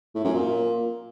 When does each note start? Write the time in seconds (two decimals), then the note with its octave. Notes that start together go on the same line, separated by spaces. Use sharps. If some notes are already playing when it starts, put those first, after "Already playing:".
0.15 A2
0.24 F#2
0.34 A#2